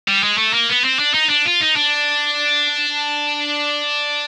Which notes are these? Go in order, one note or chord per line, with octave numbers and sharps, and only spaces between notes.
G3
G#3
A3
A#3
B3
C4
D4
D#4
D4
F4
D#4
D4